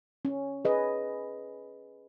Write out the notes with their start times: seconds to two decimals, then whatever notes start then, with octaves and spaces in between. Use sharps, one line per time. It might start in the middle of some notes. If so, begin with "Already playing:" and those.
0.25 C#4
0.65 G#4 B4 D#5